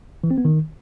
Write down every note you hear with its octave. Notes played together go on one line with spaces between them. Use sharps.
E3
C4
B3
D#3